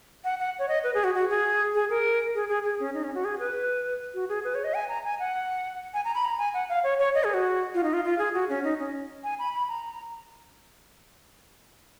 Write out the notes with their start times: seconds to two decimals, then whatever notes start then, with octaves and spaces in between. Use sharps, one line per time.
0.24 F#5
0.39 F#5
0.59 C#5
0.69 D#5
0.84 B4
0.94 G#4
1.04 F#4
1.15 F#4
1.30 G#4
1.74 G#4
1.90 A#4
2.35 G#4
2.49 G#4
2.64 G#4
2.80 C#4
2.94 D#4
3.04 C#4
3.14 F#4
3.25 G#4
3.39 B4
4.14 F#4
4.29 G#4
4.44 B4
4.55 C#5
4.64 D#5
4.74 G#5
4.89 A#5
5.05 G#5
5.19 F#5
5.94 G#5
6.05 A#5
6.15 B5
6.25 A#5
6.39 G#5
6.54 F#5
6.69 F5
6.84 C#5
6.99 C#5
7.15 D#5
7.24 G#4
7.34 F#4
7.74 F4
7.83 D#4
7.93 F4
8.05 F4
8.18 G#4
8.34 F#4
8.49 C#4
8.64 D#4
8.79 C#4
9.24 G#5
9.39 B5
9.53 B5
9.68 A#5